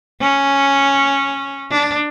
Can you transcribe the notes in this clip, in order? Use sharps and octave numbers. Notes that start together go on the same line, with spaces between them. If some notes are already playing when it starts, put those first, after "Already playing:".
C#4
D4